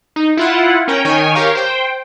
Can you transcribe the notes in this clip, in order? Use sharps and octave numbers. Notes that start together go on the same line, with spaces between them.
D#4
E4 F4 F#5
C#4 A#4 G5
D#3 C#5 G5 G#5
G4 A#4 C#5 F5
C5 G5